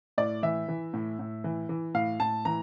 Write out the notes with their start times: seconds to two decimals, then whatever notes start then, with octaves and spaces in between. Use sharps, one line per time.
0.18 A2 D5
0.43 E3 E5
0.68 E3
0.93 A2
1.19 A2
1.44 E3
1.69 E3
1.94 A2 F5
2.20 A2 A5
2.45 E3 A#5